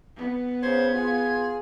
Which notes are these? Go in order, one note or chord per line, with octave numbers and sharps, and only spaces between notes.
B3
C#3 C5 G#6
F4 G#4